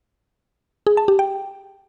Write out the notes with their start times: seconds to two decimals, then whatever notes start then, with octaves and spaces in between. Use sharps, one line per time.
0.87 G#4
0.97 A5
1.08 G4
1.19 G5